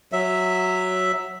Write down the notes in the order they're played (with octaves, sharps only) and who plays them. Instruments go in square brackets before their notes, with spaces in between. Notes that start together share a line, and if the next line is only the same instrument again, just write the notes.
[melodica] F#3 E5